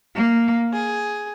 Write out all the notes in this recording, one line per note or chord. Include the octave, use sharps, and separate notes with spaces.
A#3
G#4